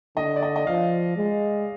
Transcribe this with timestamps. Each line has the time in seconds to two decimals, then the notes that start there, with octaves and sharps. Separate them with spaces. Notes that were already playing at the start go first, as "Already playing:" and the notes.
0.17 D3 D#5
0.36 D5
0.43 D#5
0.56 D#5
0.67 F3 F5
1.17 G#3